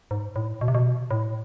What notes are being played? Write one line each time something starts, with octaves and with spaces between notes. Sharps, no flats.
G#2
A2
B2
C3
B2
A2